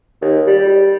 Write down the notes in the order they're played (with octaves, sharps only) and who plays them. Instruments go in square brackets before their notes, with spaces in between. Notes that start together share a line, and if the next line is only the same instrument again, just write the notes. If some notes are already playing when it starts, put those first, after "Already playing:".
[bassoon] D#2
G3
G3